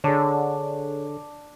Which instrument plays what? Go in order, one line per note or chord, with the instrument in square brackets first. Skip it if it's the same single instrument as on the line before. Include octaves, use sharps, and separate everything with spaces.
[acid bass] D3 [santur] D4 [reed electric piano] G#4 C#5